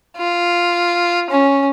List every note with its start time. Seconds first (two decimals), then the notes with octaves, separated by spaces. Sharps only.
0.17 F4
1.31 C#4